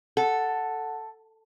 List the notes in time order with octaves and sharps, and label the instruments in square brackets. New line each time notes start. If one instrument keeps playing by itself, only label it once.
[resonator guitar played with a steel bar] A4 [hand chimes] F#5